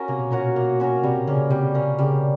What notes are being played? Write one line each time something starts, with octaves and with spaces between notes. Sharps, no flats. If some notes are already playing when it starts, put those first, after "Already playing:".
Already playing: C#4 F#4 A#4
C3 A#3
B2
A#2 C#4 F#4 A#4
B2
A#3
C#4 F#4 A#4
C3 G3
C#3 A#3 C#4
C3 G3
A#3 C#4
C#3 G3